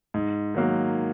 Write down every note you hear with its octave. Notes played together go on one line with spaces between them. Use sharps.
G#2
D#3 F#3 A#3